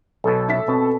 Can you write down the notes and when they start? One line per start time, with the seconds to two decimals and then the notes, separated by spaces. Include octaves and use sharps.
0.24 B1 B2 A4
0.48 E5 A5 B6
0.68 B2 C4 A5